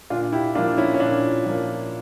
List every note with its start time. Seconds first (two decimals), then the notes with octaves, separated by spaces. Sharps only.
0.10 A#2 D4 F4
0.33 E4 G4
0.55 F3 A#3 D4 F4
0.78 C#4 E4
0.94 C#4
1.00 A#2 D4
1.46 F3 A#3